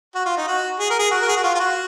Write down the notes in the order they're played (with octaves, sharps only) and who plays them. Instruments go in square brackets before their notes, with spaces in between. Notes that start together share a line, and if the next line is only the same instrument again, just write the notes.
[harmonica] F#4
F4
D#4
F#4
G#4
A#4
G#4
F#4
A#4
G#4
F#4
F4
F4
F#4